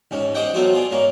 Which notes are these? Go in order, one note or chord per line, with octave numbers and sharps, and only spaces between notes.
D#2 G#2 C#4
G4 C5 D5 D#5 F#5 G5
F#3 A3 B3 C4 F4 F#4
F4 G#4 D5
G#2 A#3 C#4